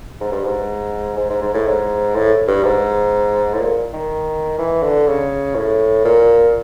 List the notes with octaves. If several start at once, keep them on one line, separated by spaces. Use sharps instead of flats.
G#2
G2
G#2
G#2
G#2
G#2
A2
G#2
A2
G2
G#2
A2
A#2
D#3
E3
D3
C#3
A2
A#2